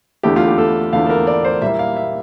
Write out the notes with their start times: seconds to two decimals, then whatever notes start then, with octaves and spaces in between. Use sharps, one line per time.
0.23 E2 D3 A3 E4 G4
0.36 F4
0.47 G4
0.58 A4
0.93 E2 D3 A3 E4 F5
1.06 A4
1.10 A#4
1.27 D5
1.45 C5
1.61 A#2 G3 A#3 E4 E5
1.79 F5
1.96 E5